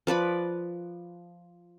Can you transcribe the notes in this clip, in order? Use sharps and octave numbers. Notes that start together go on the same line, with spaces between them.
F3 B4 D5 B5